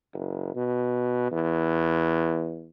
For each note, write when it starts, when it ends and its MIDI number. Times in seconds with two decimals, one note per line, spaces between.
0.14 0.54 30
0.55 1.29 47
1.32 2.70 40